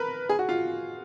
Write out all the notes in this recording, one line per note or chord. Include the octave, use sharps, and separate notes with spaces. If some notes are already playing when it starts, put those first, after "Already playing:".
Already playing: A#4 B4
G#4
F#4
F4